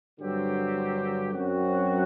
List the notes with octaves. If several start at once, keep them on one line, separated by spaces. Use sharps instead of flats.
G2 D3 F#3 C4 G4
F#2 F#3 C4 F#4